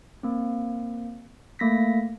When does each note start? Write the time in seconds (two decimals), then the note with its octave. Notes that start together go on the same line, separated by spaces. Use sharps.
0.23 A#3 C4
1.59 A3 A#3 A#6 B6